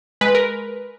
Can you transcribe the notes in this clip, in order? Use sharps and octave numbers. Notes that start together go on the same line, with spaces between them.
G#3 B4
A#4